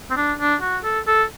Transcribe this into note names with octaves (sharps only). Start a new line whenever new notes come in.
C4
D4
D4
F#4
A4
A4